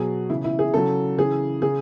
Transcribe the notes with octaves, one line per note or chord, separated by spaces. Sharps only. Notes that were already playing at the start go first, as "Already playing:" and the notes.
Already playing: B2 F#3 G#4
C#3 E3 E4
E4
G#4
C#3 F#3 A4
C#3 E3 G#4
C#3 G#4